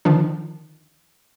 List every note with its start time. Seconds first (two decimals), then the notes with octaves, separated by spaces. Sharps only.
0.05 D3 D#3 F3 D4